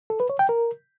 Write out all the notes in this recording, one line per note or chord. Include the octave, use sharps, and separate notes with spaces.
A4
B4
C#5
G5
A#4